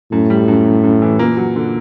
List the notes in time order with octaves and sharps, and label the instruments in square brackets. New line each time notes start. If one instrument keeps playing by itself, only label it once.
[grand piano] F#2 [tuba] A2
[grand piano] G3
F#2
F#2
F#2
E3
[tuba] A#2 [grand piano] A#3
[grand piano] F#3
D3